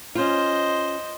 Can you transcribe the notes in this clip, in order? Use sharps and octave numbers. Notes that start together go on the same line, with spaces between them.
C#4 F4 C5 D#5